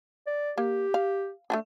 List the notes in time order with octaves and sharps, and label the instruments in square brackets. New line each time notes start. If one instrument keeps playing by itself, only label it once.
[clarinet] D5
[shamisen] A#3 [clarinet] G4
[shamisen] F5
A3 B3 D4